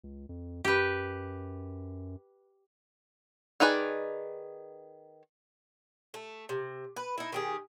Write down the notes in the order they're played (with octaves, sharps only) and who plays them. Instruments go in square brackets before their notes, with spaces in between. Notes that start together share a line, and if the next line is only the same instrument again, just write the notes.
[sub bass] C#2
F2
[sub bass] F#2 [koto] G4 B4
[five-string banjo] D#3 D#4 G#4 B4 D5
[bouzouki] A3
C3
B4
D#4 E4
D#3 G4 G#4